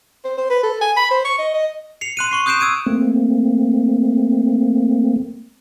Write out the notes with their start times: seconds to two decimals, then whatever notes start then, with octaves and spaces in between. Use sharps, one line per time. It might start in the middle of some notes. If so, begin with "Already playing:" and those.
0.25 C5
0.37 C5
0.50 B4
0.63 A4
0.81 G#5
0.96 B5
1.11 C5
1.24 C#6
1.38 D#5
1.54 D#5
2.01 C7 C#7 F7
2.17 C6 F#6 D#7
2.31 C6 C#6 C7
2.46 D#6 F#6 G6 C7 D7 E7
2.60 D#6 E6 G#6 D7 D#7
2.86 A3 A#3 C4